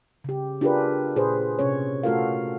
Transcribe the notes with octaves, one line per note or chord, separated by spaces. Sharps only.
C#3 G4
D4 F4 G4 G#4 A#4 B4
A#2 G#4 B4 C5
C3 C#4 C#5
A3 F4 F#4 A4 A#4 F5